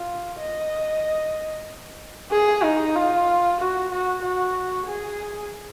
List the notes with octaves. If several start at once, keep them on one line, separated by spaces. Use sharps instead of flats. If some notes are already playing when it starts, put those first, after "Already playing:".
Already playing: F4
D#5
G#4
D#4
F4
F#4
F#4
F#4
G#4